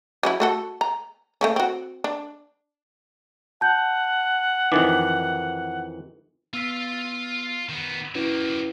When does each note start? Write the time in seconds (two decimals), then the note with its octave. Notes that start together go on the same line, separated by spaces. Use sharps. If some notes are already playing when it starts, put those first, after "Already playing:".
0.23 F#3 C#4 E4
0.40 A3 F#4 A4
0.81 A#5
1.41 A3 A#3 C#4
1.56 C4 F#4
2.04 D4
3.61 F#5 A5 G6
4.72 F2 D#3 E3 D#4 D6
6.53 B3 F4 F5 E6 B6
7.69 D#3 B3
8.15 F#3 A#3 C#4 E4 B4